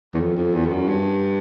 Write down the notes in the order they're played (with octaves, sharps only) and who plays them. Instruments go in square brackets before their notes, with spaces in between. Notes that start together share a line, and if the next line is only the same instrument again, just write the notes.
[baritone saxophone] E2
F2
F2
E2
F2
F#2
G2